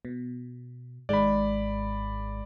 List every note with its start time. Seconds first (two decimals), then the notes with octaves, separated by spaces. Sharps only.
0.05 B2
1.09 G#1 G#2 G#3 D5 B5